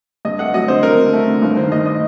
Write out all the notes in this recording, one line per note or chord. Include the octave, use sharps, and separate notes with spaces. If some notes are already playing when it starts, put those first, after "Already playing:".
G2 D#5
A3 F#5
F#3 D#5
D3 C5
D3 A#4
D3
A3
D3
G1
D#3 C5
G2 D#5
D#5